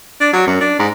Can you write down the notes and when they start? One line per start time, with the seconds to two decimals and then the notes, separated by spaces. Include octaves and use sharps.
0.21 D4
0.33 F#3
0.47 F#2
0.61 D4
0.79 G#2